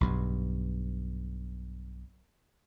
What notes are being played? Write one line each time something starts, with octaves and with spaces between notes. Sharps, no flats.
B1 G2